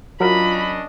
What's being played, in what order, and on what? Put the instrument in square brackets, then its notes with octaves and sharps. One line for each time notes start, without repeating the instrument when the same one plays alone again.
[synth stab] F#3 A#4 [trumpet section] C#4 D4 D#5 [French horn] F4 [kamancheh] B5